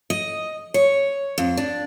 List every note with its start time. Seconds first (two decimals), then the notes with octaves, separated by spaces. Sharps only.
0.10 D#5
0.74 C#5
1.38 F2
1.57 D4